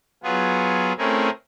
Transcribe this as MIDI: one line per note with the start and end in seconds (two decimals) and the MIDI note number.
0.23 0.93 54
0.23 0.93 59
0.23 0.93 65
0.23 0.93 68
0.98 1.30 57
0.98 1.30 60
0.98 1.30 61
0.98 1.30 64
0.98 1.30 68
0.98 1.30 70